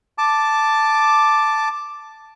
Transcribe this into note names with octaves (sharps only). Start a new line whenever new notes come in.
A5 D6